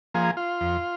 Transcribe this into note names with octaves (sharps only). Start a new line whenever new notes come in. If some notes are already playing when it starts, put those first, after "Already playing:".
F3 A#3 G#4
F4
F2